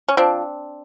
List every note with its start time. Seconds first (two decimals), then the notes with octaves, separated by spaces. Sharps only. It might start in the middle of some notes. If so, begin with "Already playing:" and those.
0.08 C#4
0.17 F3 C4 D4